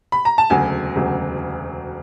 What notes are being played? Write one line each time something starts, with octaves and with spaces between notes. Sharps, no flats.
B5
A#5
A5
E1 D2 C#3 F#3 G#5
E1 D2 C#3 F#3